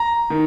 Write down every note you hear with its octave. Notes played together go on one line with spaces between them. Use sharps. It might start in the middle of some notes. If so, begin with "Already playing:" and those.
Already playing: A#5
D#3